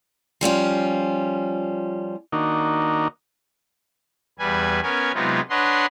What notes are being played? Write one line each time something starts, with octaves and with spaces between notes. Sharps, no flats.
F3 G3 C#4 F4
D#3 A#3 D4 D#4 F#4
E2 G3 B4 G#5
B3 C#4 A#4 G#5
C3 F#3 G#3 B3 D#4 F4
D4 B4 C#5 D#5 F#5 C6